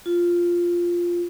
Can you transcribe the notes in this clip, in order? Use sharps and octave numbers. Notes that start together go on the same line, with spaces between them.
F4